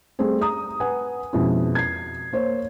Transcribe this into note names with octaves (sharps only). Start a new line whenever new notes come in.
G3 A3 C4 G#4
A#5 D#6
B4 F#5 G#5
F2 B2 G#3 C#4 E4
G#6 C7
A#3 C5 C#5